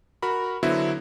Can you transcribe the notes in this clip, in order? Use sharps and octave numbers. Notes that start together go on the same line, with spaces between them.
F#4 A#4 B5
D3 F#3 B3 E4 F#4 C5